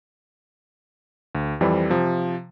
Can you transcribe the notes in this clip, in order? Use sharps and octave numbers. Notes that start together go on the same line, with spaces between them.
D2
F2 E3 G3 C4
C3 F3